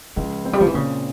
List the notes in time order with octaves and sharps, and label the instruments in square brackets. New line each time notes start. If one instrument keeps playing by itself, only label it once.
[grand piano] C#2 [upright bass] F3
[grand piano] C4
[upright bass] G3
F3
E3
[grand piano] A#2 [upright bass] C#3